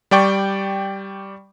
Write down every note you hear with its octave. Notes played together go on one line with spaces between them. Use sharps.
G3 D5 G5 C#6